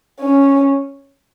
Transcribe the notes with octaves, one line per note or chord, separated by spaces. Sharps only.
C#4